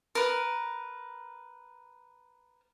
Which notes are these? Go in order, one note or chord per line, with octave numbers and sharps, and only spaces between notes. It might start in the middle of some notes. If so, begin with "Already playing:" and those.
A#4 B4